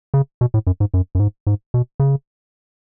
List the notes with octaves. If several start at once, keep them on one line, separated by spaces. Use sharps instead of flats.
C#3
B2
A2
F#2
G#2
F#2
F#2
G#2
G#2
B2
C#3